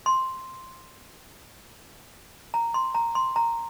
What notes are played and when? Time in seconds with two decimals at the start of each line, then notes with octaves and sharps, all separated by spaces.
0.06 C6
2.54 A#5
2.74 C6
2.95 A#5
3.15 C6
3.36 A#5